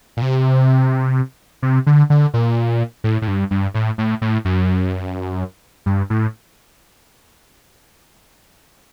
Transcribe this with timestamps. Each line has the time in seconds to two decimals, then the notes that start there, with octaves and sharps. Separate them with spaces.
0.17 A#2
0.22 C3
1.62 C3
1.87 D3
2.10 D3
2.34 A#2
3.04 A2
3.22 A2
3.28 G2
3.51 G2
3.74 A2
3.98 A2
4.22 A2
4.45 F#2
5.86 G2
6.10 A2